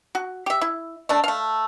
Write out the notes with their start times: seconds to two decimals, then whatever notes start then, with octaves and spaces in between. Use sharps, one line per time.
0.15 F#4
0.46 G4 E5
0.61 E4
1.09 A3 D4
1.24 A3 F5